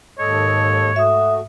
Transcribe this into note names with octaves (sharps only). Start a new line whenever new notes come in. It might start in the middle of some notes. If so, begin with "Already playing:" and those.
D#2 G#2 A4 C#5 D#5
A3 F#4 E5 D#6